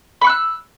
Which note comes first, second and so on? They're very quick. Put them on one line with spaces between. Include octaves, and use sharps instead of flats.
B5 C#6 F#6 E6